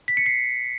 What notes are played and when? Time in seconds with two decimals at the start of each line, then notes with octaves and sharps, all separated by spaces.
0.08 B6
0.17 C#7
0.26 C7